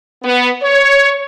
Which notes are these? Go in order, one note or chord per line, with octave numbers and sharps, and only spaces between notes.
B3
C#5